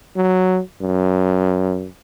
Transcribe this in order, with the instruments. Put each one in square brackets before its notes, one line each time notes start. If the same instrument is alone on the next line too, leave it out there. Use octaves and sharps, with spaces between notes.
[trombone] F#3
F#2